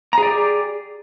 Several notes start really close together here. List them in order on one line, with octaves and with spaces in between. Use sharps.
A#5 G#4 D5 G4